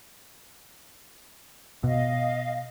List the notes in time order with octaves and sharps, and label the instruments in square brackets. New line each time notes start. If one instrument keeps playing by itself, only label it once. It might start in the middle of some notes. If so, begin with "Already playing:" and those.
[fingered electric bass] B2 [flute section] D#5 F5